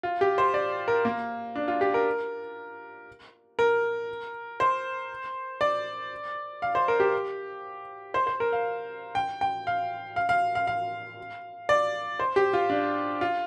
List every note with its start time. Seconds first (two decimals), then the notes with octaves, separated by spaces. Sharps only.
0.03 F4
0.21 G4
0.38 C5
0.54 D5
0.88 A#4
1.05 A#3
1.56 D4
1.68 F4
1.81 G4
1.94 A#4
3.59 A#4
4.60 C5
5.61 D5
6.62 F5
6.75 C5
6.88 A#4
7.00 G4
8.14 C5
8.27 C5
8.40 A#4
8.52 F5
9.15 G5
9.41 G5
9.67 F5
10.16 F5
10.29 F5
10.55 F5
10.67 F5
11.69 D5
12.20 C5
12.36 G4
12.53 F4
12.70 D4
13.21 F4